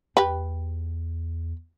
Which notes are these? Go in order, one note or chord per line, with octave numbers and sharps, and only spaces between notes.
E2 G4 B4